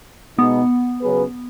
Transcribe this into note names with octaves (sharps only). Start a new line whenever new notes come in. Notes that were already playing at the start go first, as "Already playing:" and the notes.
B2 G#3 B3 D#4
C#3 F#3 C#4 G#4 B4